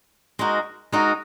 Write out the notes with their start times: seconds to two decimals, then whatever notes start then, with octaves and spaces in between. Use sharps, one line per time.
0.39 G#3 D#4 F#4 A#4
0.92 G#3 D#4 F#4 A#4